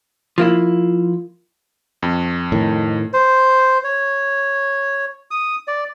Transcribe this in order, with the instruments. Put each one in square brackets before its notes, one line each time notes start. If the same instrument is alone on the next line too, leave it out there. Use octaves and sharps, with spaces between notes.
[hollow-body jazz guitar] F3 A#3 E4
[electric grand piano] F2
[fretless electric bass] A2 D#3
[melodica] C5
C#5
D#6
D5